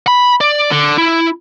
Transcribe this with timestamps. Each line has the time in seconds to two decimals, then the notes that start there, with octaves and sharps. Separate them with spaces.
0.08 B5
0.41 D5
0.72 D3
0.98 E4